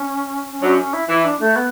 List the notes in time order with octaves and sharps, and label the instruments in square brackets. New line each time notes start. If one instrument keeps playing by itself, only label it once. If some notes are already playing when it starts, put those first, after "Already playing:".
Already playing: [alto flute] C#4
C#4
[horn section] F#2 F#3 [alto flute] D4
[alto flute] C#4
E4
[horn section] E3 [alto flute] E4
[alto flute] D4
A3
B3